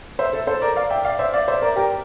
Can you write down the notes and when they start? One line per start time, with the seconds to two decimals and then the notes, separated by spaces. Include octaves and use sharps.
0.19 C5 E5
0.33 A4
0.47 A4 C5
0.61 A#4 D5
0.76 D5 F5
0.90 E5 G5
1.05 D5 F5
1.19 C5 E5
1.33 D5 F5
1.48 C5 E5
1.62 A#4 D5
1.76 G4 A#4